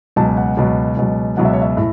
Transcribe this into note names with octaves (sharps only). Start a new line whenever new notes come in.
C#2 B2 F#3 A5
F#5
C#2 B2 F#3
C#2 B2 F#3
C#2 B2 F#3 F#5
E5
C#5
E5
A2